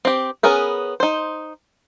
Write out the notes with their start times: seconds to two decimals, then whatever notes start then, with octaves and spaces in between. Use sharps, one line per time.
0.05 C4 G4
0.43 B3 C#4 G#4 A#4 B4
1.00 D#4 C5